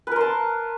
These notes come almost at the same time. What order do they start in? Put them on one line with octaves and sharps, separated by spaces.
B4 A#4 C6 A5